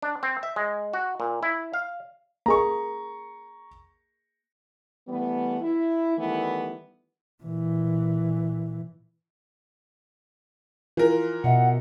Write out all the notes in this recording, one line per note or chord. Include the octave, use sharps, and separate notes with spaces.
D4
C4
E5
G#3
F#4
A#2
E4
F5
A#3 G#4 A#5 C#6
E3 G3 A3 B3
E4
D#3 E3 G3 A3 B3 E4
A#2 E3
E3 F4 A#4
B2 D#5 E5 F#5